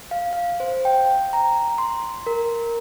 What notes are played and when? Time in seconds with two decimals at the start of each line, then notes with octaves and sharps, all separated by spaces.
0.11 F5
0.33 F5
0.60 C5
0.85 G5
1.33 A#5
1.78 C6
2.27 A#4